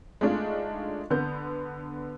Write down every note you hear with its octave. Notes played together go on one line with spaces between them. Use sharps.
G#3 A3 D4 D#4 F4
D3 B3 G6